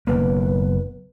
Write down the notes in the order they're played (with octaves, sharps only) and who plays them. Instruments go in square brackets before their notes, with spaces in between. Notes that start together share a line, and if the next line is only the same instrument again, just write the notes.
[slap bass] F#1 B1 A#3 [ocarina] B4